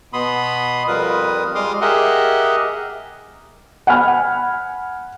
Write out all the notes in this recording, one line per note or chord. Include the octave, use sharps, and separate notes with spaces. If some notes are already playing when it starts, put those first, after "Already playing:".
B2 B3 B5 C6 D#6
F2 G3 F4 A#4 B4 D#6
G3 G#3 C6 D6 D#6 F6
G4 G#4 A#4 D#5 E5 F#5
F#5 G#5 B5 F6